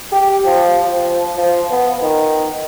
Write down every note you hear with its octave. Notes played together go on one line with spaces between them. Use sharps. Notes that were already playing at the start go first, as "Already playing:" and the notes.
G4
F3
F3
F3
B3
D#3